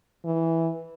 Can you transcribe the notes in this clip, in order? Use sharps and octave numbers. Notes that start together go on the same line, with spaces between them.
E3